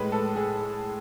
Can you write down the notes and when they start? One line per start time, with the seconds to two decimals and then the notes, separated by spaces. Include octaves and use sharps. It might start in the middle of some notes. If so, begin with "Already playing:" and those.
Already playing: A2 G#3 B4
0.12 A4
0.36 G#4